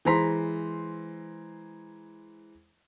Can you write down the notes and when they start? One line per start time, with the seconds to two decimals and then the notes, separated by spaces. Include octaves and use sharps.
0.05 E3 G#3 C5 A#5 C6 B6